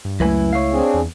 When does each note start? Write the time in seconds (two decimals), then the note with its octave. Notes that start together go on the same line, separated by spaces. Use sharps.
0.05 G2
0.20 C#2 F#2 A3 E4 B4 G#5
0.53 C#5 F5
0.73 C4 D4 G#4
0.94 E2